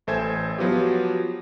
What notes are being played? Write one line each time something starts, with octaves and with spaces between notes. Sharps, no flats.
A1 A4 C5 E5 G#5 G#6
F3 F#3 B3 F4 G4